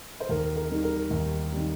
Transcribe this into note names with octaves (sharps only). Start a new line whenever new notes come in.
C5
D#2 A#4
A#4
D#3 G3
A#4
D#2
D#3 G3